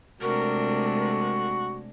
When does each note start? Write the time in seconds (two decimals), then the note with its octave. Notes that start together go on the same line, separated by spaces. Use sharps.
0.22 C3 G#3 A3 D4 F#4 A#4